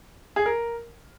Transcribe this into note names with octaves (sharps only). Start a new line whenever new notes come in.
G#4
A#4